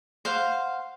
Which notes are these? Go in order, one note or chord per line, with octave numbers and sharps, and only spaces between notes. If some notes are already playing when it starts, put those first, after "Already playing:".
C5 F5 F#5